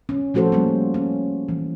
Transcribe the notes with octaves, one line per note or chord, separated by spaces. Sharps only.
C#4
F3 A3 F#4 A4 C5
G3 A#3 C#4
C#4
E3